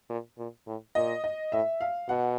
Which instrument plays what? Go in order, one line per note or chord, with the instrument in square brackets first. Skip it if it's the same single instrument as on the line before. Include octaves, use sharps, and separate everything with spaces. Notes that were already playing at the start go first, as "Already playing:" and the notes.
[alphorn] A#2
A#2
A2
[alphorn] A#2 [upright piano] D#5
[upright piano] D#5
[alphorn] A2 [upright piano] E5
[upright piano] F5
[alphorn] B2 [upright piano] F#5